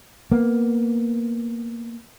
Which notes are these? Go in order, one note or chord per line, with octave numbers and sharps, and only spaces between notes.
A#3 B3